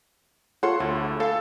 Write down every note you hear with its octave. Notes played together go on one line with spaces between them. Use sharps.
F4 A4 C#5 F#5 C6
D2 E4 A4
A4 F5